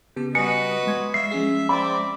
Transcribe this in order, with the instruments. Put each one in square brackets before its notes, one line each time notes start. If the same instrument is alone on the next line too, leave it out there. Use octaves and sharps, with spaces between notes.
[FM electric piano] C#3 B3 A5 [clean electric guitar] G4
[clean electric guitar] G3 G#5 [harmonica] F#4 B4 D#5 [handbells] C#7
[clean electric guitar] G#3 [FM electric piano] C6 C#6 G#6
[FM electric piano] D5 F5 [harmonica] E5 [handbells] C7
[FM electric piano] F3 C#4 G#4
[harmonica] C4 D5 E5 [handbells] B5